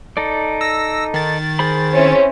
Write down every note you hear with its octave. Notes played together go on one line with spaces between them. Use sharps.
D#4 A4 D5
E6 A#6
D#3 A6
G#4 C5 B5
C4 C#4 E4